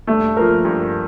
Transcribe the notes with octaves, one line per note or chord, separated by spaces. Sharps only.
G2 A3
F3 A#3 F4 A#4
G2